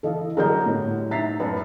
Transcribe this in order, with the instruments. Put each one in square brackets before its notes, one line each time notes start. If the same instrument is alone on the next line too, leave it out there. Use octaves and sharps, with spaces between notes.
[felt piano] E3 [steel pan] A4 D#5 F5
[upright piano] D3 F#3 G3 [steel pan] G#4 A#4 D#5 [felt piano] A#5 G6
[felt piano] A2
[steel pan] D#4 E5 A#5 [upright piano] A6 B6 C7
[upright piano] F#2 [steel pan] B4 A5